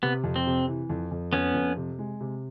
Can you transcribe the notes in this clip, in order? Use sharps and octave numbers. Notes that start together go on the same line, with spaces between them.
C3 B3
F2
C4
C3
E3
F2
F2
F2 B3 C#4
F2
C3
G#3
C3